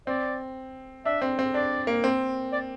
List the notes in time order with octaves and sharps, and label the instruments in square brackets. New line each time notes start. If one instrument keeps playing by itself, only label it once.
[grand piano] C4 [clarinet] D5
[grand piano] D4 [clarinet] E5
[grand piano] C4
C4
[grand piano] D4 [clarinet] D5
[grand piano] A#3
C4
[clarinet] D5